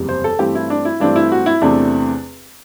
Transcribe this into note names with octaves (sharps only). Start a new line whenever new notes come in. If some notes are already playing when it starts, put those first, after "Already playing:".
Already playing: F#1 E2 C3 G3
C5
A4
G2 E3 A3 C4 G4
E4
D4
E4
G2 E3 A3 C4 D4
E4
F#4
E4
E2 C3 E3 A3 C4 D4